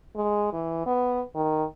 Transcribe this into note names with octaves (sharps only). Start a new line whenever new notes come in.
G#3
E3
B3
D#3